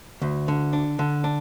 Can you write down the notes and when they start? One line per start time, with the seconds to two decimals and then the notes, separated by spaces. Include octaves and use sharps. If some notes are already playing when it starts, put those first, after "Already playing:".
0.22 D2
0.48 D3
0.73 D4
0.99 D3
1.24 D4